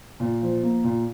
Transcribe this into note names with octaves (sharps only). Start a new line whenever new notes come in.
A#2
F3
A#3
A#2